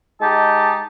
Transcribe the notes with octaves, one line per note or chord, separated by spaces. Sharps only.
G#3 D#4 G4 A5